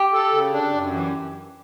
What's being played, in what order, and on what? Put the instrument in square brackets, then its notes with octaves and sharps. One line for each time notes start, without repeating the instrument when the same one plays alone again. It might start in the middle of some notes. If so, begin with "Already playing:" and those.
Already playing: [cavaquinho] G4
[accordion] A4
C#3
D4
F#2
E3